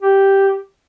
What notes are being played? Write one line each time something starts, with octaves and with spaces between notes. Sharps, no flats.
G4